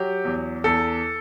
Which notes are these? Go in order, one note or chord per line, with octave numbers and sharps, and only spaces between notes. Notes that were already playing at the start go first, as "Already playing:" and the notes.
Already playing: F#3 G4
E2
E2 A4